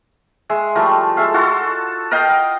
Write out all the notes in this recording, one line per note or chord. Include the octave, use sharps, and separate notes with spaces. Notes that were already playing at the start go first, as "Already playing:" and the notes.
G#3 E5
F3 G3 A3 A#4
G#3 A4 E5 F5
F4 F#4 A4
A#4 D#5 F5 G5